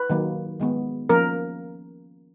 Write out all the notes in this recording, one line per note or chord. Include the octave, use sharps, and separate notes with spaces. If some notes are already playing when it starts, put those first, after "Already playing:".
Already playing: B4
D#3 F#3 A#3
D#3 G#3 B3
F3 A#3 C#4 A#4